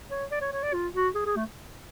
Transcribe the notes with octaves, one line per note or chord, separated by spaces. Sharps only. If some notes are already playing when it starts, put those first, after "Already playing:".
C#5
D5
C#5
C#5
D5
F4
F#4
G#4
G#4
A3